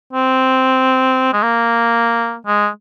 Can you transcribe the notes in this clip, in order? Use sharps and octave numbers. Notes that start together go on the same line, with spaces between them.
C4
G#3
A#3
G#3